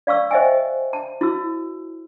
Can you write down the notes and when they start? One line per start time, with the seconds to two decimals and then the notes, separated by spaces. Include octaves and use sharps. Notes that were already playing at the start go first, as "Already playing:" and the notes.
0.07 D5 F5 C#6 E6
0.31 C5 D#5 E5 G5 G#5
0.93 A5
1.21 E4 F#4 E6